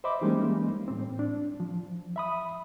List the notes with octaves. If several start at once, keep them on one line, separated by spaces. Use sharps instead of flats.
C5 D#5 E5 B5 D6
E3 G3 G#3 A#3 C#4 D#4
A2 C4
D4
F3
E5 B5 D#6